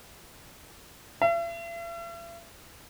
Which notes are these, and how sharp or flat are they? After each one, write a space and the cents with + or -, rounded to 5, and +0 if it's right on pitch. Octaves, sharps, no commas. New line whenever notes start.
E5 +45